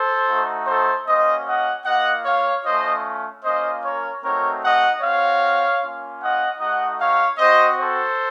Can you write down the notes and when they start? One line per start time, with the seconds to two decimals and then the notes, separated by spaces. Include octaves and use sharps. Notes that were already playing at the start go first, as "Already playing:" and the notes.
Already playing: A4 C5
0.28 A3 D#4 F#4
0.67 A4 C5
1.06 A#3 C#4 F#4 C5 D#5
1.46 D#5 F#5
1.85 A#3 F4 D#5 F#5
2.25 C#5 F5
2.64 A3 C#4 F4 C5 D#5
3.43 A#3 C#4 F4 C5 D#5
3.83 A#4 C#5
4.22 A3 C4 D#4 F#4 A#4 C#5
4.62 D#5 F#5
5.01 C4 F#4 C#5 F5
5.81 A#3 C#4 F4
6.20 D#5 F#5
6.59 A3 D#4 F#4 D#5 F#5
6.99 C#5 F5
7.38 C4 F#4 C5 D#5
7.78 A4 C5